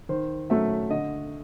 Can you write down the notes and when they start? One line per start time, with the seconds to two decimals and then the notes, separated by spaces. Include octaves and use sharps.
0.09 D#3 C5
0.50 F#3 A3 C#4 E5
0.90 D3 D#5